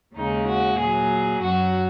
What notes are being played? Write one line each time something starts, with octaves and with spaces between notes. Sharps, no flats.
D#2 C#3 G#3 D#4
F#4
A#2 F#3 G#4
F#2 F#3 F#4